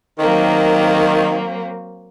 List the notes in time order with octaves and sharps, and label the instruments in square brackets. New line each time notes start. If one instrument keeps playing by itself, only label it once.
[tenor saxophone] D#3 [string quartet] F#3 A#3 C4